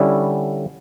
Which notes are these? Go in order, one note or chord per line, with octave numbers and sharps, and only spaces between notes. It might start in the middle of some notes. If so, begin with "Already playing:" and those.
Already playing: D3 G3 C#4 E4